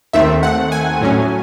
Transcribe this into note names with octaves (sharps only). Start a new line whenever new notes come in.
D#2 D#3 A3 C4 E5
F#5
G#5
A2 F#3 C#4